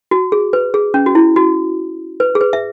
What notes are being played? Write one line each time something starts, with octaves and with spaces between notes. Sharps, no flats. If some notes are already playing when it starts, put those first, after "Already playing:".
F#4
G#4
B4
G#4
C#4
F#4
E4
F#4
B4
G#4
B4
E5